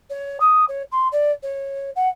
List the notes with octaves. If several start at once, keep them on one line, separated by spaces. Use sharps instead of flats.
C#5
D#6
C#5
C6
D5
C#5
F#5